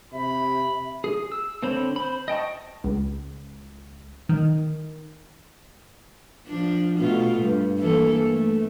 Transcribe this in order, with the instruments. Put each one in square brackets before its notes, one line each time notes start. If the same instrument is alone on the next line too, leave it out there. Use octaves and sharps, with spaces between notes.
[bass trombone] C3 [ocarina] E5 [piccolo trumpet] B5
[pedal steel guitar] G#4
E6
D3 C4 C5 C#5 B5
C5 B5
D#5 G5 A5 C#6
[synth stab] C#2
D#3
[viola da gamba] F3 D4
B2 A3 F4
G2
E3 A#3 A4
A3